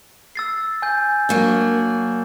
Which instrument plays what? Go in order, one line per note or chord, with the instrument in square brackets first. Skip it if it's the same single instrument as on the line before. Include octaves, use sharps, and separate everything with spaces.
[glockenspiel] E6 A6 C7
G#5 G6
[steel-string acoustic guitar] F#3 A#3 D4